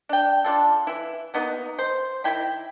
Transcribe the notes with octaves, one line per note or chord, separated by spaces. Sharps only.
D4 G5
D4 F4 A4
E3 E4
A#3 B3 D#4 F#4
C5
D#3 E4 G5 B5